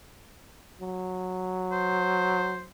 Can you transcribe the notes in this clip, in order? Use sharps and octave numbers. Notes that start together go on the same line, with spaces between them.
F#3
C5